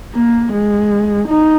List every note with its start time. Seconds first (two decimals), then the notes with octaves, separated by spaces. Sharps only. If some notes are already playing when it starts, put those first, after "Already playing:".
0.14 A#3
0.52 G#3
1.29 D#4